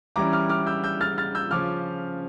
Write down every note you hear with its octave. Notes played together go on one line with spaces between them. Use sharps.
E3 G3 C#4 E4 A#5 D6
D6 F6
D6 F6
E6 G6
E6 G6
F6 A6
F6 A6
E6 G6
C#3 F3 C#4 D6 F6